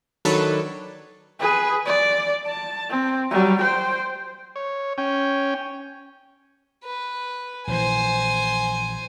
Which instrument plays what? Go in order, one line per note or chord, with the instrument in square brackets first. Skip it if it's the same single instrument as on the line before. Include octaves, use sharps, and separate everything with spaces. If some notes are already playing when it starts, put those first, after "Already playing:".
[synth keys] D#3 F#3 D4 A4 B4 C#5
[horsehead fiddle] G#4 B4
D5
A5
C4
F#3 G3
C5 G5
[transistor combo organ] C#5
C#4 G5
[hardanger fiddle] B4
[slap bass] A#1 E3 [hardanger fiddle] C5 G#5